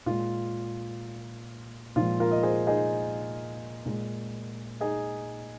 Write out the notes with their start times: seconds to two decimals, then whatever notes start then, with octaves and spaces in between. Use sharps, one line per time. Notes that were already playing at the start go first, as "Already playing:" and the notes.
0.06 A#2 G#3 F4
1.96 A#2 F3 G#3 F4
2.20 F4 A#4
2.32 D#5
2.43 G#4 C5
2.67 D#4 G#4
3.86 A#2 G#3
4.81 D#4 G#4